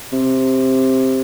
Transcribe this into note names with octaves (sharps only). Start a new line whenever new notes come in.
C3